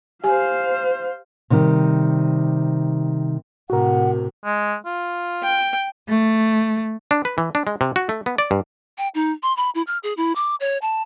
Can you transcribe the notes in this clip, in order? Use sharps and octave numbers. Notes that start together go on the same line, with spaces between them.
G4 C5 F5 G#5
C3 D#3 G3
A2 C3 F#4 A#4 F#5
G#3
F4
G5
A3
D4
B4
E3
D4
G#3
C3
F#4
A3
B3
D5
G2
G5
D#4
C6
B5
E4
F6
G#4
E4
D6
C#5
A5